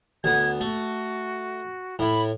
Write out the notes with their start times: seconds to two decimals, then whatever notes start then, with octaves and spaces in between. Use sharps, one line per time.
0.24 D2 B3 G#6
0.61 A3 F#4
1.99 A2 E4 B5